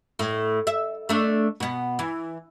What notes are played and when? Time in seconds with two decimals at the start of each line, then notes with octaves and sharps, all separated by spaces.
0.19 A2
0.67 E5
1.09 A3 D4
1.60 B2 B3
1.99 E3